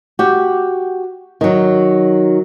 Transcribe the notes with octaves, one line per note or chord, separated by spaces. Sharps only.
F#4 G4
D#3 F#3